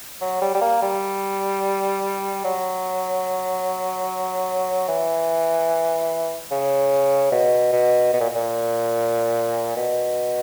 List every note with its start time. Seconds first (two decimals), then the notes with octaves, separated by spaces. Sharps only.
0.21 F#3
0.41 G3
0.55 G3
0.61 A#3
0.82 G3
2.44 F#3
4.88 E3
6.51 C#3
7.32 B2
7.72 B2
8.14 B2
8.20 A#2
8.35 A#2
9.76 B2